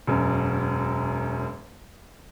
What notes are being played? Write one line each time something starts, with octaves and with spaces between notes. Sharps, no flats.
E1 F#2